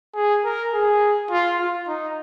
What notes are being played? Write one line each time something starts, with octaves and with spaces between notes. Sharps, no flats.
G#4
A#4
G#4
F4
F4
D#4